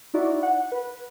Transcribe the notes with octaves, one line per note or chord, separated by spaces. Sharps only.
D#4 E4 F#4 D5
F#5
B4